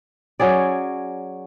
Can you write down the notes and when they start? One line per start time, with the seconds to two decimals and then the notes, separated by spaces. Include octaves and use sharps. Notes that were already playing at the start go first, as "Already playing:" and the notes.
0.40 F#3 C#4 G#4 D5